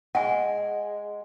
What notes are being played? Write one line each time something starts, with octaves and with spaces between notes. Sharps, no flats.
G#3 F#5 G#5